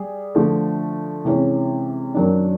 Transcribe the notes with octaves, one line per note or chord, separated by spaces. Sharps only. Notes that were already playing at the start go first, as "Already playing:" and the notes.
Already playing: G3 G#4
D3 F3 A3
C3 E3 G#3 C#4
F#2 D#3 F#3 A#3 D4